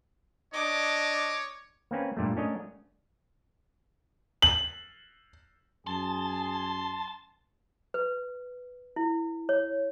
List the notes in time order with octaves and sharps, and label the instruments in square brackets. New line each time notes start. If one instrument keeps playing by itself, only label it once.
[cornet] D4 [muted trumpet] C#5 [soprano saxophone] D#5 [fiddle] D6
[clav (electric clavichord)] A#3 C4 C#4 B4
G2 A#2 G3 A3
A3 C#4 D4 A#4 C#5 D#5
[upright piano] F#7
[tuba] F#2 [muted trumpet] G#4 [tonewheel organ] A5 [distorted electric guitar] C6
[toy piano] B4
E4
C#5